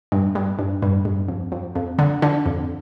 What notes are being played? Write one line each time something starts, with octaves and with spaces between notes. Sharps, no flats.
G2
G2
G2
G2
G2
F2
F2
F2
D3
D3
F2